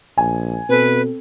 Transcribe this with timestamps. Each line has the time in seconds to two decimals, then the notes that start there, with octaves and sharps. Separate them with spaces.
0.18 A#1 G#5
0.69 B2 C4 A4 B4